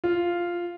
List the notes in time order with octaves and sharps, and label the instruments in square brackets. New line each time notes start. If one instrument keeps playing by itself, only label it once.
[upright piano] F4